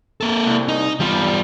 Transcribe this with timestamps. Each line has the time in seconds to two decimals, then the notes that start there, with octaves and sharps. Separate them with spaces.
0.21 A#3 A4
0.46 C2
0.68 D#4
1.00 E2 G3 F4